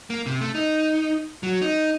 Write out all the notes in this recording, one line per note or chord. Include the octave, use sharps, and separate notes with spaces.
A#3
C3
A3
D#4
F#3
D#4